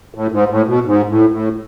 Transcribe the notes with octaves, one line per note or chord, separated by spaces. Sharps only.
A2
G#2
A2
B2
G#2
A2
A2